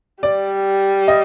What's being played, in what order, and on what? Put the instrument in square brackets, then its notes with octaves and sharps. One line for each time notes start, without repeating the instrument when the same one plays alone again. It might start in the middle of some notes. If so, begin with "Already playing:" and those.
[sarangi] G3 [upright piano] D5
[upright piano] D#5